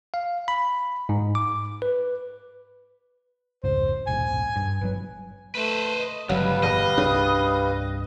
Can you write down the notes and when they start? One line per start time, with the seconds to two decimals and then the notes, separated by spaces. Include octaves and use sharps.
0.14 F5
0.48 B5
1.09 G#2
1.35 D6
1.82 B4
3.64 F1 C#2 G#2 C5
4.07 D#1 B1 G#2 G#5
4.56 G2
4.81 G1 C3 F#3 B4
5.55 A3 B4 C5
6.00 D#5
6.29 G1 C#2 C#3 F#3 G3 B4 F5
6.63 E2 A#2 D#5
6.98 C2 G2 C#3 D4